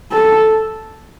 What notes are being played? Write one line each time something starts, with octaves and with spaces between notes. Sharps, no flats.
A4